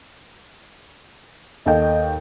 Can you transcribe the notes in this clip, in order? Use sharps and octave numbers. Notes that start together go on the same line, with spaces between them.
D#2 A4 D#5 G5